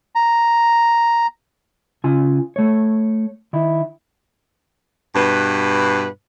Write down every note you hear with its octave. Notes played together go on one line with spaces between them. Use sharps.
A#5
C#3 F4 G#5
A3 C#5
D#3 E4
G2 B2 B4